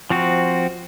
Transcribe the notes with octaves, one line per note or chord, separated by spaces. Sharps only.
F3 C4 F#4